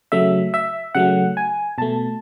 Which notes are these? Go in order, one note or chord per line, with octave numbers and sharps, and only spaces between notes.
C#3 F#3 A3 E5
E5
C#3 F#3 A3 F#5
G#5
B2 A3 A5